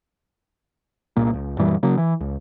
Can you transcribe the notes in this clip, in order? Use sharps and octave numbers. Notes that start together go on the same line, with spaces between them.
C2 A#2 A#3
C#2
F#2 A#2 E3 G3
C#3 F#3 A#3
E3
C#2